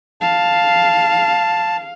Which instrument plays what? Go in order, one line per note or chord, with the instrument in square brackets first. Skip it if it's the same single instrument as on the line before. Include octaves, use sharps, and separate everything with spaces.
[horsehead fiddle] F5 [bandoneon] A5